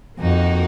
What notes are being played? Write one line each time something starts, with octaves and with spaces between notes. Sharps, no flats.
F2 A#3 D#4 F#4 A#4